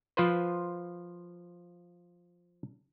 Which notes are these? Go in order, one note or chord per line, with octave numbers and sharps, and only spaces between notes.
F3 F4 B4 C5